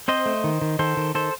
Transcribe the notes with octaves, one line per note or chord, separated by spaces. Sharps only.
C4 C5 D#5
A3
D#3
D#3
D#3 A4 C5
D#3
D#3 A4 C5